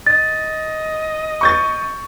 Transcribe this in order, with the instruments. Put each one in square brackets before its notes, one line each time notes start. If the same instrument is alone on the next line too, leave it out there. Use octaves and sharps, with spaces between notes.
[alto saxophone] D#5 [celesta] A6
[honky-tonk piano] C#6 G6 A6